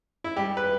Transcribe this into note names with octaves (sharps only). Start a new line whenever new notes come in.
E4
G3 G4
B4